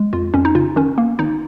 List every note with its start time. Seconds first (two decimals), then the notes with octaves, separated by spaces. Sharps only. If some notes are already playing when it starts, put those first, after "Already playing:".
Already playing: G#3
0.13 F2 F4
0.34 F2 C#4
0.45 D#4
0.55 C#3 F4
0.76 D#3 C#4
0.98 A#3
1.19 G#1 D#4